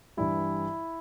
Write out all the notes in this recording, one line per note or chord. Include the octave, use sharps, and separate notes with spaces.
G2 E3 G3 E4